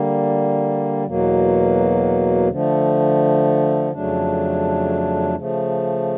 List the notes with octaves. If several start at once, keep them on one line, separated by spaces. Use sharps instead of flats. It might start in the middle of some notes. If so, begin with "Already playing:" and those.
Already playing: D3 G3 A#3
E2 B2 F#3 A#3
D3 F3 A3
F2 C#3 F#3 A3 D4
C#3 F3 A3